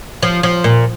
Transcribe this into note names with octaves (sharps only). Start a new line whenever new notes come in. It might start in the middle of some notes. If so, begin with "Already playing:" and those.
F3
F3
A#2